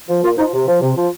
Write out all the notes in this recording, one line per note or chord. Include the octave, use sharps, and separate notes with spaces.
F3
A#2 F4
F3 D#4
C3
F3
C3
F3